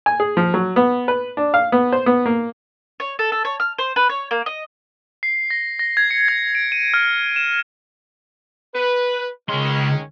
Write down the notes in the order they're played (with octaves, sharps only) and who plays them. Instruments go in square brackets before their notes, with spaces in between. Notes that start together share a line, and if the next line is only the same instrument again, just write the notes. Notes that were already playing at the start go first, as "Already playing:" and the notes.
[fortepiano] G#5
G#4
F3
F#3
B3
B4
D4
F5
B3
C5
B3
A#3
[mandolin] C#5
A4
A4
C#5
F6
C5
B4
C#5
A#3
D#5
[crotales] C7
A#6
A#6
G#6
C#7
G#6
D7
D#7
F6
E7
[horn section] B4
[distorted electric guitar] C#2 C6 [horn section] D#3 G#3 C#4